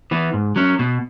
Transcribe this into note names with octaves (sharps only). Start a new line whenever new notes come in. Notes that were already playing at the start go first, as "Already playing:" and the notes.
E3 B3
G#2
F#3 C#4
B2